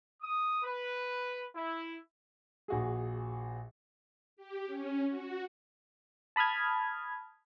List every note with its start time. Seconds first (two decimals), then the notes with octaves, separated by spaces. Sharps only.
0.21 D#6
0.64 B4
1.54 E4
2.68 A#1 F#4 G#4
4.37 G4
4.67 C#4
5.09 F#4
6.36 A5 B5 D#6 F6 G#6